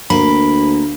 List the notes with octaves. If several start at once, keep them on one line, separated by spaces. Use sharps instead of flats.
D2 A#3 B5